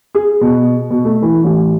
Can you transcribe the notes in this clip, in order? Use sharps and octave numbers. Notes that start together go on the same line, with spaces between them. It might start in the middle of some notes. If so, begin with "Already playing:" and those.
G#4
B2
B2
A3
E3
A1